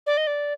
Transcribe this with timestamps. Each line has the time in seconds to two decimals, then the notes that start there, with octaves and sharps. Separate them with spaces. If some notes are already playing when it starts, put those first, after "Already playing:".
0.06 D5
0.17 D#5
0.27 D5